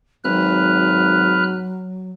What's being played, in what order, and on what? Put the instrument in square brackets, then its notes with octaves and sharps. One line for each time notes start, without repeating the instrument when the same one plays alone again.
[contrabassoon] G#1 [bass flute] F#3 [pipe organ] B4 F6 F#6